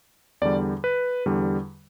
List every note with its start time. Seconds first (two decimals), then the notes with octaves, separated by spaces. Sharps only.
0.42 E2 D3 G3 D5
0.84 B4
1.26 E2 D3 G3